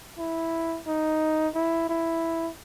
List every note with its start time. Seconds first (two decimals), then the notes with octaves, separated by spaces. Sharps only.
0.18 E4
0.87 D#4
1.55 E4
1.89 E4